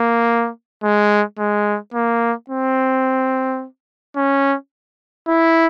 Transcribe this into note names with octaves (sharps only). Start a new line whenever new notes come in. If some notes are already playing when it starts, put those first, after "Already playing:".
Already playing: A#3
G#3
G#3
A#3
C4
C#4
E4